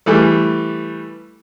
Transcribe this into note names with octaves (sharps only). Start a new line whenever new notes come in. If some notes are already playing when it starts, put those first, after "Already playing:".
E3 G3 A3